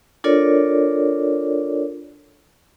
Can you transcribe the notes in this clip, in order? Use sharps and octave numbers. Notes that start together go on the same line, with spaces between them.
D4 F4 A4 A#4 C#5 D5